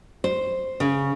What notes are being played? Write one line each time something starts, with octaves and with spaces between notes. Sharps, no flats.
C5
C#3